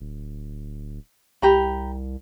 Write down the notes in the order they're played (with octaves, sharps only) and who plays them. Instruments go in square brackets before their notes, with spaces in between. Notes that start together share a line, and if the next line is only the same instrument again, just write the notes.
[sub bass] D1
[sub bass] C2 [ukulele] G4 A#5 B5